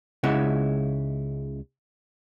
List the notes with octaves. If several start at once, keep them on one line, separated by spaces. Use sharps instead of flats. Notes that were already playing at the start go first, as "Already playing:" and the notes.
C#2 C#3 G#3 D#4 E4 F#5